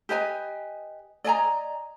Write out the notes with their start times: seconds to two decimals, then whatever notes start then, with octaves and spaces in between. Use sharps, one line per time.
0.09 G4 B4 D#5 G#5
1.24 D5 D#5 G#5 A#5